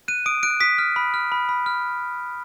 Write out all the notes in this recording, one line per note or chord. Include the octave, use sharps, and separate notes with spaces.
F#6 D#7
D#6 D7
F#6 D7
D#6 B6
F6
B5
F6
B5
B5
F6